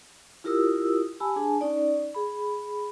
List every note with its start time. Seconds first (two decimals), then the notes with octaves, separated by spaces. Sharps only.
0.44 E4 F4 G4 A#4 D#6 E6
1.20 G4 G#5 A5 B5 E6
1.36 D4 G#4 G#5 A5
1.61 C#4 D#4 D5
2.15 G#4 B5